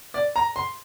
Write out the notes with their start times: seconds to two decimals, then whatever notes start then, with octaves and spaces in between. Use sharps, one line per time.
0.14 D5
0.36 A#5
0.56 C6